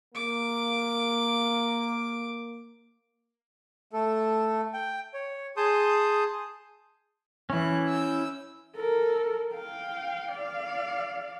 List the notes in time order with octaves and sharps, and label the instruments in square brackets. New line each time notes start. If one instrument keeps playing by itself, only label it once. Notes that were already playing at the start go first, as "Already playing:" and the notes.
[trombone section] A#3 [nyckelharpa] D6
[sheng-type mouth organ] A3 A4
G5
C#5
G#4 A5 C6 D#6 G6
[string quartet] E3 F#6 [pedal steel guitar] C#4 E4
[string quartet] E6 G6
[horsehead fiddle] A4 A#4
F5 G5
D5 F5